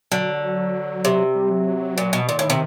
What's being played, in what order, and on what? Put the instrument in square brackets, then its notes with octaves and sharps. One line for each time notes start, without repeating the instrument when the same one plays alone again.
[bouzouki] D3 [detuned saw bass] F#3
[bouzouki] C3
[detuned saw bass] G3
F#3
[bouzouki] A#2
B2
[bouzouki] A#2 [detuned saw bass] D#3
[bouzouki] A2
C3